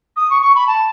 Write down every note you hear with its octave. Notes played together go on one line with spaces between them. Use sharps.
D#6
C#6
C#6
B5
A5